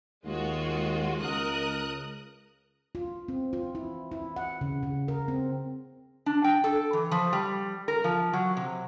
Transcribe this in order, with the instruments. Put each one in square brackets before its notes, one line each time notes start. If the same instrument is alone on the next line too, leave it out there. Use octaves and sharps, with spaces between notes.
[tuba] D#2 [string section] G#3 F4 F#4
[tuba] C#2 [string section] A#4 D#6 F#6
[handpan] F4
C4
F4
E4
E4
F#5
C#3
C#3
A#4
C4
[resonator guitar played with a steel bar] D4
G5
A4
E3
F3
G3
A#4
F3
F#3
C3